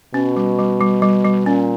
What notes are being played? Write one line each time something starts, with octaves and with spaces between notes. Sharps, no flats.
B2 C#4
G3
G3
G3
G3
G3
A#2 C#4